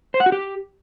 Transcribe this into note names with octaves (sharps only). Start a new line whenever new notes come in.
C5
F#5
F#4
G4